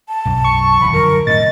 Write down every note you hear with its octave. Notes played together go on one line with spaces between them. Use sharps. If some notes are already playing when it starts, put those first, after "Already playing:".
A5
B1 F#2
C#6
D#1 D#3 B5
F#2 D3 F3 A#4
A2 C3 D#3 D#5 A6